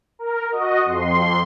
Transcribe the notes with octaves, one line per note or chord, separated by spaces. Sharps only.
A#4
F#4 D#5
F2 C6